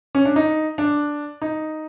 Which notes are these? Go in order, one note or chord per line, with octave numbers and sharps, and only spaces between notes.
C#4
D4
D#4
D4
D#4